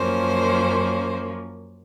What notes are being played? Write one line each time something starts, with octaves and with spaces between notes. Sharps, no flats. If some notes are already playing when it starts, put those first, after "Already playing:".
Already playing: F#2 F3 A#3 C#4 C5